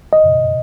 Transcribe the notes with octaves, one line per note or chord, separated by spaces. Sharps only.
D#5